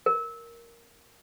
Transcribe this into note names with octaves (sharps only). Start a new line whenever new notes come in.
A#4